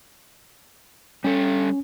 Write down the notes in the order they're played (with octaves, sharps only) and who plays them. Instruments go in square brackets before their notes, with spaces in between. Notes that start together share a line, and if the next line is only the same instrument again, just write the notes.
[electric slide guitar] G3 A4 [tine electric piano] C#4